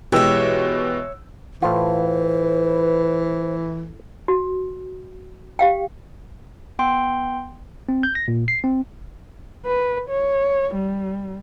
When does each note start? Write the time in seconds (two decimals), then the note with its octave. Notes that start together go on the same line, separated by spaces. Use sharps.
0.12 B2 E3 G#3 G4 C#5 E5 G5 E6
1.62 A2 E3 F4 B4 C5
4.28 F#4
5.59 G4 F5 G5
6.79 B3 G5 C6
7.89 C4
8.03 G6
8.15 A#6
8.28 A#2
8.48 C7
8.64 C4
9.66 B4
10.10 C#5
10.75 G3